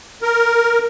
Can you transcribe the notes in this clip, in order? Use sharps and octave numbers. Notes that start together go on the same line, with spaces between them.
A#4